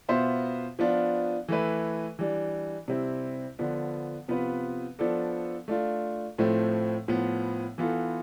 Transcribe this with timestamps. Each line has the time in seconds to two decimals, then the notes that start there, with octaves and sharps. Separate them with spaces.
0.09 B2 B3 F4 C5 E5
0.79 F3 B3 D4 F4
1.48 E3 A3 E4 B4
2.19 E3 G3 D4
2.88 C3 G3 C4 E4
3.59 D3 F3 B3 D4
4.28 C3 F3 B3 F4 B4
4.99 F3 B3 D4 A4 D5
5.68 A3 D4 F4
6.38 A2 F3 A3 C4
7.08 A2 F3 B3
7.78 E3 B3 F4 A4